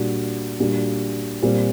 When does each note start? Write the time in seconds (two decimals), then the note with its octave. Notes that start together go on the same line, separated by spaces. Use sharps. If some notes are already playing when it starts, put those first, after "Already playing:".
Already playing: A#2 G3 D4 F#4
0.60 A#2 G3 D4 F#4
1.42 A#2 G3 C4